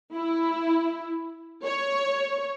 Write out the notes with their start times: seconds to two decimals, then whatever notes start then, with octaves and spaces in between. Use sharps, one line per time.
0.14 E4
1.65 C#5